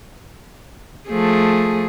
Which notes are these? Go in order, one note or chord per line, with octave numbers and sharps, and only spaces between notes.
F3 A3 G#4